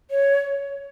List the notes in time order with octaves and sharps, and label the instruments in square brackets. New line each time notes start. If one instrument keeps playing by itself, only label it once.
[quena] C#5